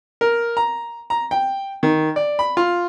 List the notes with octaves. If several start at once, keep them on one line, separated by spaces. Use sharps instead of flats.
A#4
A#5
A#5
G5
D#3
D5
B5
F4